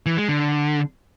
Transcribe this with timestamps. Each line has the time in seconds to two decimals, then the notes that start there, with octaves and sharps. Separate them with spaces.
0.06 E3
0.17 G#3
0.28 D3